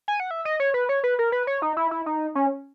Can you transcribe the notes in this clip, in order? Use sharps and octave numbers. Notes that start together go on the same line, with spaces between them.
G#5
F#5
E5
D#5
C#5
B4
C#5
B4
A#4
B4
C#5
D#4
E4
E4
D#4
C#4